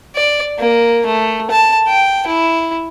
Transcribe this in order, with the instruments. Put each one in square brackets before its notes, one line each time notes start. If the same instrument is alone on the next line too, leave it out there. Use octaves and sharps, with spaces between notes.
[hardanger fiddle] D5
A#3
A3
A5
G5
E4